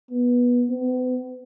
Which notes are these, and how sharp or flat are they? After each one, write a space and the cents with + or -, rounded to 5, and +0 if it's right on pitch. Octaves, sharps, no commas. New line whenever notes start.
B3 -15
B3 +40